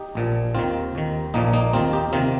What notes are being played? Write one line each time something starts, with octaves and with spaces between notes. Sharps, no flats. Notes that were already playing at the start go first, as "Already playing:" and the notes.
Already playing: D#4 G4
A#1 A#2 F3
D#2 D#3 C4 F4
D#2 D#3
A#1 A#2 F3 A#3 D#4
A#3 D#4
D#2 D#3 C4 F4
D#4 G4
C3 D#3 C4 F4